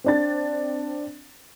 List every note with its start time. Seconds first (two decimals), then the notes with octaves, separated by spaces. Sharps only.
0.04 C4 D4 A6